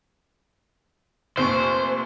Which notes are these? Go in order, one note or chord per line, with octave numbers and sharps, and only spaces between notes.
F1 A#2 C5 C#6